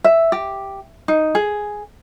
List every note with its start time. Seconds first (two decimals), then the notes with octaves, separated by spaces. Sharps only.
0.04 E5
0.32 G4
1.08 D#4
1.35 G#4